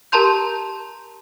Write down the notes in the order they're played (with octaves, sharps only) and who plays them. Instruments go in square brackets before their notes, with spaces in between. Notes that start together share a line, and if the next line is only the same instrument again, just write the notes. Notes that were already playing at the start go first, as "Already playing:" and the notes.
[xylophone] G4 A#4 A5 A#5 C6 G6